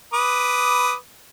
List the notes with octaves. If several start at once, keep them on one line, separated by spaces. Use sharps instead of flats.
B4 D6 D#6